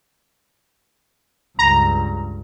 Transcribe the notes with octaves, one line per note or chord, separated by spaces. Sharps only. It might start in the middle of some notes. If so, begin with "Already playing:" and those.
C#2 G2 A#5